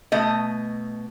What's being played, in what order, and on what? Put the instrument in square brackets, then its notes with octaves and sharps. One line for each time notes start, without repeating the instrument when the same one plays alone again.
[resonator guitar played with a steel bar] B2 A3 D#5